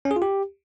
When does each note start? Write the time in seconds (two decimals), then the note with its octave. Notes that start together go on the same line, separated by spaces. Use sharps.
0.05 C#4
0.11 G#4
0.16 F4
0.22 G4